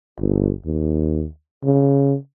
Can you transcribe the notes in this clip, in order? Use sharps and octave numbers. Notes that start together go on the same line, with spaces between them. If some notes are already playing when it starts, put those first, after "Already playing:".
G1
D#2
C#3